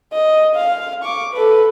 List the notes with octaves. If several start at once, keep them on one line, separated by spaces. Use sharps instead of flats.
D#5
F5
C#6 D6
A4 B4